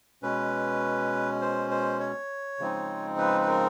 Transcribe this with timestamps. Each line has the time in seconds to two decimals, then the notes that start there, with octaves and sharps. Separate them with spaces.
0.23 B2 G#3 C#4 B4
1.41 C5
1.71 C5
2.00 C#5
2.59 C#3 F3 G#3 C4 D#4
3.18 B4
3.41 B4
3.48 A#4